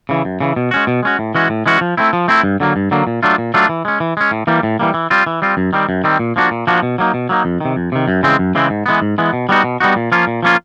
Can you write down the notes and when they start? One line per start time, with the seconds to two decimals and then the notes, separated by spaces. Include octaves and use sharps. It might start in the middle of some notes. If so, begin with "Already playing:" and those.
0.09 C#3 E3
0.25 F#2
0.40 C#3 E3
0.56 B2
0.71 G#3 C#4 F#4
0.87 B2
1.03 G#3 C#4 F#4
1.19 A2
1.35 E3 G#3 C#4 F#4
1.50 A2
1.66 E3 G#3 C#4 F#4
1.81 F3
1.97 A3 C4 E4
2.13 F3
2.28 A3 C4 E4
2.43 G2
2.60 D3 F#3 A#3
2.76 G2
2.91 D3 F#3 A#3
3.07 A#2
3.23 F#3 A3 D4 F4
3.38 A#2
3.54 F#3 A3 D4 F4
3.69 E3
3.85 G#3 C#4
4.00 E3
4.17 G#3 C#4
4.31 A2
4.47 E3 G3 A#3
4.63 A2
4.80 E3 G3 A#3
4.94 E3
5.10 G3 C4 F4
5.26 E3
5.42 G3 C4 F4
5.57 F#2
5.73 D#3 G3 C4
5.89 F#2
6.04 D#3 G3 C4
6.19 A#2
6.36 F3 A#3 D4 F#4
6.51 A#2
6.67 F3 A#3 D4 F#4
6.83 B2
6.98 F#3 A#3 D#4
7.14 B2
7.29 F#3 A#3 D#4
7.45 F2
7.60 C3 D#3
7.76 F2
7.92 C3 D#3
8.08 F#2
8.23 C#3 E3 G#3 C4
8.39 F#2
8.55 C#3 E3 G#3 C4
8.70 G#2
8.86 E3 G#3 B3
9.02 G#2
9.18 E3 G#3 B3
9.33 B2
9.49 G3 B3 D#4 F#4
9.64 B2
9.80 G3 B3 D#4 F#4
9.96 A#2
10.12 F3 A#3 C#4 F4
10.27 A#2
10.43 F3 A#3 C#4 F4